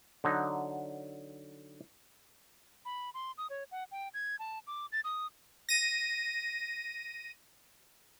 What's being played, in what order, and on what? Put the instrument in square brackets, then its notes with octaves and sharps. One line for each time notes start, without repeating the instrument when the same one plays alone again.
[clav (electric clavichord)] D3 F#3 D#4
[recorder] B5
C6
D#6
C#5
F#5
G5
G#6
A5
D6
A6
D#6
[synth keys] A#6 D#7